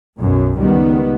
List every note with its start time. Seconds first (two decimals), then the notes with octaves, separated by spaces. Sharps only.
0.19 B1 F#2 B2
0.59 C#2 D#3 G3 B3